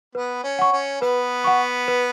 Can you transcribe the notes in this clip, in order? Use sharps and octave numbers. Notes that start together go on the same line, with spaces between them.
B3 B4
C#4
F#5 C#6
C#4
B3 B4
F#5 C#6
B4